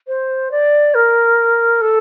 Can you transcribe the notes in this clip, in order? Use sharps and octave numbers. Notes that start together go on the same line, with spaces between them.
C5
D5
A#4
A4